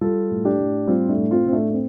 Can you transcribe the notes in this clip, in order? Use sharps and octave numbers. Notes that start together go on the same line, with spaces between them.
G3 F4 A4
A2
D4 G4
A2
G3 C4 F4
A3 D4
A2
C4 F4
A2 C4
A3 D4
A3
C4